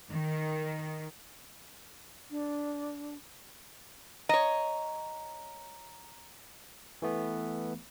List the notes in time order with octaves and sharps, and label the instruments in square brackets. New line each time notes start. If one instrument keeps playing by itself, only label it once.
[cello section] D#3
[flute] D4
[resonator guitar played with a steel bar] C#5 D#5 [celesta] A#5
[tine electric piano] E3 A3 B3